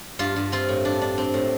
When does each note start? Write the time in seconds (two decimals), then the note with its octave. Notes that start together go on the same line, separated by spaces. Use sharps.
0.19 G2 F4
0.36 G2
0.52 C4 F4
0.69 A2
0.85 D4
1.02 D4
1.18 C4
1.34 A2